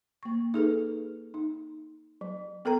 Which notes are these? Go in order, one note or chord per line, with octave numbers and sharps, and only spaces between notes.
A#3 C#6
D#4 G#4 A4 B4
D#4
F#3
B3 A4 A#4 G5 A#5